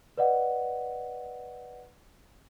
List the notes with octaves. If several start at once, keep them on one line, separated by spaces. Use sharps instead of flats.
B4 D5 D#5 F#5